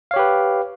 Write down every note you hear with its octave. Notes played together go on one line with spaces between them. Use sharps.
G4 B4 C#5 F5